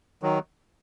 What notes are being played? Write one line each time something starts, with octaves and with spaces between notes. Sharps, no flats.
D#3 F#3